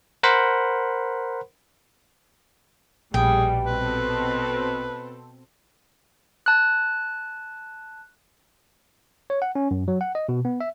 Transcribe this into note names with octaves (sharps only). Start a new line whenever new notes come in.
A#4 C5 F#5 B5 C6
A#1 B2 G3 G#4 G5
B2 C4 A4 B4
A5 F#6
C#5
F#5
C#4
F#2
F#3
F#5
D#5
B2
B3
E5